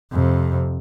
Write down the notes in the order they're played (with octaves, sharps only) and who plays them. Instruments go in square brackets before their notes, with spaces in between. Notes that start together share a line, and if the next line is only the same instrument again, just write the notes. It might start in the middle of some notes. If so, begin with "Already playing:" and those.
[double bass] F2 C3